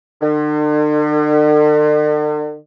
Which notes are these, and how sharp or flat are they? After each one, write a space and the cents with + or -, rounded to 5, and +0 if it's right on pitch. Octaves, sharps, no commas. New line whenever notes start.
D3 +45